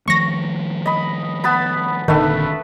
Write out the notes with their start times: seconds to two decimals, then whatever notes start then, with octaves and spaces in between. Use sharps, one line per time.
0.08 D#3 F3 A3 C#6 A#6
0.86 D#5 B5
1.44 B3 A5 B5
2.08 F1 A#2 D3 D#3 A3 B4 E5